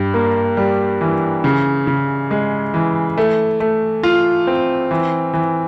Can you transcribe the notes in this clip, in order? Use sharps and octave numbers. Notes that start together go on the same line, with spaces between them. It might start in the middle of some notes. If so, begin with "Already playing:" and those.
Already playing: G2
A#3
G3
E3
C#3
C#3
G#3
E3
A3
A3
F4
C4
E3
E3